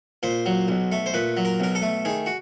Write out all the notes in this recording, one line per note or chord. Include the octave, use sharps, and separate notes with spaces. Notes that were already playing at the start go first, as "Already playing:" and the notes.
A#2 C5
F#3
B1
A3
C5
A#2 B4
F#3
A#4
B1 A#4
A4
A3
D#3 G#4
F#4